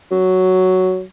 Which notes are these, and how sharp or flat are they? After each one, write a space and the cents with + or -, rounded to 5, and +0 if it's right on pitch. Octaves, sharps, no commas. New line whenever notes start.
F#3 +5